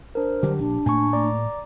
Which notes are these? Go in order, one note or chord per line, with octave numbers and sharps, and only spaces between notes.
D4 A#4 C5
D3 F#3 G3 G4
A#1 D4
A2 A3 A#3 G#5 C#6
D5 A#5 D6